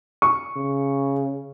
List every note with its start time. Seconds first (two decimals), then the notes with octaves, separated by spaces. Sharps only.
0.22 C#6
0.57 C#3